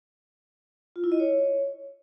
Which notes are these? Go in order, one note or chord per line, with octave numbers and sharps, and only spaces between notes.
F4
E4
D#5
C#5